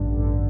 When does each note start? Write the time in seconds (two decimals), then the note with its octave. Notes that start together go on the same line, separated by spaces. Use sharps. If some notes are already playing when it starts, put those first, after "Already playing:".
Already playing: A1 G2 D3
0.19 A1 G2 D3